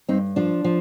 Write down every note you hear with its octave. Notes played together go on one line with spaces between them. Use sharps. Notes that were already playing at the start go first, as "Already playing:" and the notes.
G2 C4 D#4
F3 D4 F4
F3